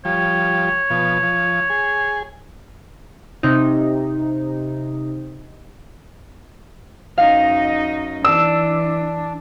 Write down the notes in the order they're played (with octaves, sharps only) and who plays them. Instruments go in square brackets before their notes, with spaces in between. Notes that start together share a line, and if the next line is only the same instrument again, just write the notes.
[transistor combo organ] F3 G3 [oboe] C#5
[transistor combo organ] B2 F3
F3
G#4
[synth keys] C3 D#4
[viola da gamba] F#2 D#4 D#5 [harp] F5
[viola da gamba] E3 [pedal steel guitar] D4 [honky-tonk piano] E6